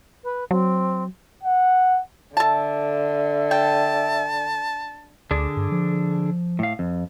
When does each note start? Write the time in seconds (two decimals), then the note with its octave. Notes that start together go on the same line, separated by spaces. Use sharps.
0.24 B4
0.51 F#3 C4
1.43 F#5
2.37 D3 A4 E5 A5
3.51 G5 A5
5.31 D2 D3 D4 G#4
5.57 G2
5.71 F3
6.59 A2 F5
6.79 F2